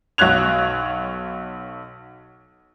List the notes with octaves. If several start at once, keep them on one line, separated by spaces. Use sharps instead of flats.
B1 F#4 C#5 F#6 G#6 F7